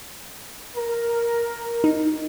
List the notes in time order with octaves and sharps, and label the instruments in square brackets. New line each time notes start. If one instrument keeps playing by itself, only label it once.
[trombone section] A#4
[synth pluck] D#4